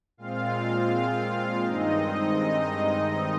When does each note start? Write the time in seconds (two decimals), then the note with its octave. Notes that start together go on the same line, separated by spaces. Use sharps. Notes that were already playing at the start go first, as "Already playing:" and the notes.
0.17 A#2 G#3 C4 F4 F5
1.64 G2 D#3 G#3 C4 D#4 D#5